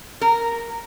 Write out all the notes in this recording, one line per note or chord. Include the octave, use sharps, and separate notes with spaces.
A#4